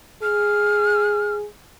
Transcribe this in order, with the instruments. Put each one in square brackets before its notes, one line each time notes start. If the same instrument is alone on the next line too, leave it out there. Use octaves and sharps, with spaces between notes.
[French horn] G#4 [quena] F6